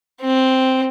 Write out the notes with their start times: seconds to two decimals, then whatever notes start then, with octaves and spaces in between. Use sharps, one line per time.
0.21 C4